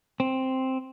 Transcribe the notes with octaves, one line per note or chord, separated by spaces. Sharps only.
C4